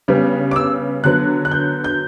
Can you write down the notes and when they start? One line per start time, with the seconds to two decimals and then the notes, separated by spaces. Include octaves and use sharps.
0.08 C#3 G3 B3
0.51 D6
0.56 E6
1.04 D3 F#3 B3 F#6
1.45 F#6
1.51 G6
1.84 G6